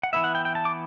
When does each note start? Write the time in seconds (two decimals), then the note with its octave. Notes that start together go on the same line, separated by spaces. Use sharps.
0.03 F#5
0.13 E3 B3 E4 E5
0.24 F#5
0.35 G5
0.45 G5
0.55 A5
0.65 D6